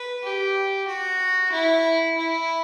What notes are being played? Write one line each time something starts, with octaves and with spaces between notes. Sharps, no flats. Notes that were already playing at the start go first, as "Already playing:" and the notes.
Already playing: B4
G4
F#4
E4
E4